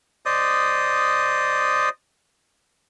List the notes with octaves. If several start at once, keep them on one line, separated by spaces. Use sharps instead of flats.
C5 D5 D#5 D#6